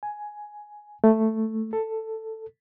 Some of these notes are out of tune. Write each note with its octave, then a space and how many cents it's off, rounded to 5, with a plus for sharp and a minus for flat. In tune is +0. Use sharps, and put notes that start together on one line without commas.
G#5 +5
A3 +5
A4 +10